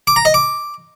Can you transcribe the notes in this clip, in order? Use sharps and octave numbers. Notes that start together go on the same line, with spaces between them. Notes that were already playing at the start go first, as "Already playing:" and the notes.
D6
A#5
D#5
D6